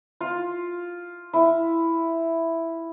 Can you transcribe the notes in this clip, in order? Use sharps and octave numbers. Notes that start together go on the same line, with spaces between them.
F4
E4